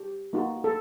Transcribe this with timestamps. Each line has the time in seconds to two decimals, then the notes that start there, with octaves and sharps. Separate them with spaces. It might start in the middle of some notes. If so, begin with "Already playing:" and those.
Already playing: G4
0.33 A#3 D#4 F#4
0.64 A4